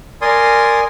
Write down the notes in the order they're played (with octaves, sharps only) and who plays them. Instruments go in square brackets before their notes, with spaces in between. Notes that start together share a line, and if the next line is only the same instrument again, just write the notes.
[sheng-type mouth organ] A#4 D5 G#5 C6 D#6